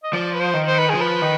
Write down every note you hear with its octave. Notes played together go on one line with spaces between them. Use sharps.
D#5
F3 D5
B4
C5
D#3
C5
B4
G#4
F3
B4
D#3